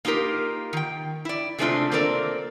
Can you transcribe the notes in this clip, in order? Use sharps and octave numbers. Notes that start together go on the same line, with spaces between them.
A#3 D#4 F4 G4 A#4
D#3 G5
E4 D5
C3 G#3 A3 C4 D4 F4
A#3 C4 D4 A4 A#4 D5